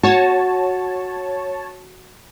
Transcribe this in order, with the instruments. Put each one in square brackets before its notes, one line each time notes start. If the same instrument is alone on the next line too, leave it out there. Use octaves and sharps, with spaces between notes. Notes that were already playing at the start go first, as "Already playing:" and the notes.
[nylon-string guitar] F#4 [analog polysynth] C#5 A5